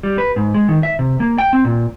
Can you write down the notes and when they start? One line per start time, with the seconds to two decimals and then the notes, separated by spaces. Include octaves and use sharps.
0.03 G3
0.18 B4
0.36 G#2
0.54 G#3
0.68 D#3
0.83 E5
0.99 C3
1.20 A#3
1.38 G5
1.53 C4
1.65 A#2